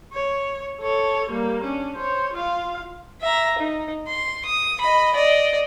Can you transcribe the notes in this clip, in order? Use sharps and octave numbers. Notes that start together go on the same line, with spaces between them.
C#5
A4 C#5
G3 A#3
C#4 D4
C5 C#5
F4 F5
E5 A#5
D#4
C6
D#6
D#5 B5
D5 D#5